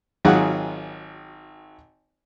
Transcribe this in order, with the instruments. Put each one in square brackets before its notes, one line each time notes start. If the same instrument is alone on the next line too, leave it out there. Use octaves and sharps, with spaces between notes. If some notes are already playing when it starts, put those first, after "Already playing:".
[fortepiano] G#1 D#3 F#3 F4 G#4 F#5